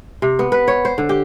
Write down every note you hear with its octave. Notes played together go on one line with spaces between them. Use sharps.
C3
B3
B4
C#5
C5
D3
G4